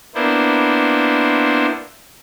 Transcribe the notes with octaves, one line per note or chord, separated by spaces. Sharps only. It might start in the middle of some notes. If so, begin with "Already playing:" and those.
A#3 B3 D4 E4 C5